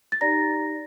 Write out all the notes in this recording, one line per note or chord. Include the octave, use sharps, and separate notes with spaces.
A6
D#4 G4 D5 A#5 A#6